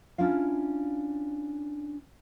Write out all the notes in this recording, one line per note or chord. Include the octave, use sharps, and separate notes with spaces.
C#4 D4 E4 F4 F5